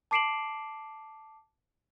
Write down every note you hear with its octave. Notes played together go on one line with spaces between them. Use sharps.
A5 D6 C7 D7 E7 F#7